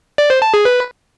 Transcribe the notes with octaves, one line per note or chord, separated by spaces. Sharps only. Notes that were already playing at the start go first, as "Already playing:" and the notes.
D5
C5
A5
G#4
B4